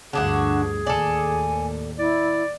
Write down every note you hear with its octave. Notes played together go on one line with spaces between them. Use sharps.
D2 G2 D3 F3 D4 F#4 G#4
D#2 A2 A4 D5 G#5
E4 D5